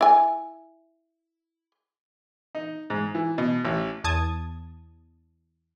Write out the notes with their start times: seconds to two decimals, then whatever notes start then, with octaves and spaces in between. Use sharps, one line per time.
0.01 E4 G#5
2.55 D#4
2.90 G#2
3.15 E3
3.38 B2
3.65 A1
4.04 E2 A5 D#6 G#6